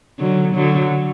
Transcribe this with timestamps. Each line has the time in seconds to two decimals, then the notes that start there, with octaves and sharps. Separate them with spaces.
0.19 D3 F#3
0.55 D3 F#3